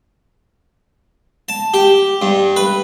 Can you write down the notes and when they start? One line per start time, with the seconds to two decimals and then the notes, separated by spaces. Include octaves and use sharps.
1.49 A5
1.74 G4
2.22 G2
2.56 B4